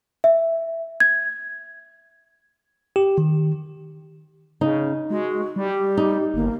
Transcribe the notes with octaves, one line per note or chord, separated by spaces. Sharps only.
E5
G#6
G4
D#3
C#3 D#4
G#3 F#4
G3 G4
D#4
G1 A#3